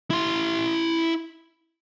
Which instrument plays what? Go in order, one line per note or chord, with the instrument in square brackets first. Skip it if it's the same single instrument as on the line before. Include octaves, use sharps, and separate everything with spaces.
[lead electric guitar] E4 C6